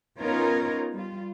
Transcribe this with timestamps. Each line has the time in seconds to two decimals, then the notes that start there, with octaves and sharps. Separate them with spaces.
0.19 B3 C#4 D#4 F4 A#4 C#5
0.94 G3 F4